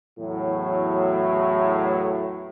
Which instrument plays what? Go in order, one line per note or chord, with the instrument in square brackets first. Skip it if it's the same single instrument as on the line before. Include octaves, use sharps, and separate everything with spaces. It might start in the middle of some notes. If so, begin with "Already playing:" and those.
[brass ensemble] E2 A2 F#3